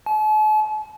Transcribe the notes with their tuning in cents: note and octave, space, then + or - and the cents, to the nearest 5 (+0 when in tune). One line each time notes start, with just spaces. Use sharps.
A5 -45